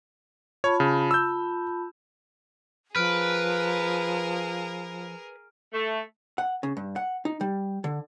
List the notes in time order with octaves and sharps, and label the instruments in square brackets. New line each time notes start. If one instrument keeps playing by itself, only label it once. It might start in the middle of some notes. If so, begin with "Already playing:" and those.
[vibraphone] F4 A5 B5 [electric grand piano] C#5
[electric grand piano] C#3
E6 G6
[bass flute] F3 [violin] G#4 A#4 [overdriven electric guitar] B4 [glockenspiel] F6 D7
[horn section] A3
[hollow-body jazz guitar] F#5
C#3
G2
F#5
D#4
G3
D3